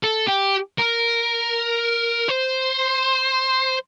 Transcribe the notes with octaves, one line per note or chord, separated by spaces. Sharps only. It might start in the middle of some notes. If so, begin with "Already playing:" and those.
A4
G4
A#4
C5